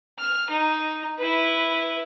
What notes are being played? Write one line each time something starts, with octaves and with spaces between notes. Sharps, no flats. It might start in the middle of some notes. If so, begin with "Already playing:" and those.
F6
D#4
E4 B4